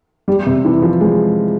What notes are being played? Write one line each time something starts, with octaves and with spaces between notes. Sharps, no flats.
G3
C3
E3
F3
G#3